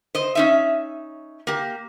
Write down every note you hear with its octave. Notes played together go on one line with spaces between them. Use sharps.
C5 D#5
C#4 D#4 E5
A#3 G4